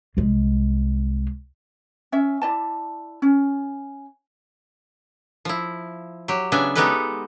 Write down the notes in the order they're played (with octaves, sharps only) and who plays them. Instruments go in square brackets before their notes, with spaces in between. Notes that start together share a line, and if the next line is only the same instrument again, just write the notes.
[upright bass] C2 G#3
[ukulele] C#4 E5
E4 D5 A5
C#4
[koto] F3 E4
F#3 G4
C#3 B3 D4 E5 G#5
G#3 B3 D#4 G4 A4 B4